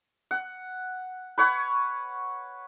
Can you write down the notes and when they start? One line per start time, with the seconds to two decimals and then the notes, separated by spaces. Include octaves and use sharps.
0.31 F#5
1.38 B4 C#5 F#5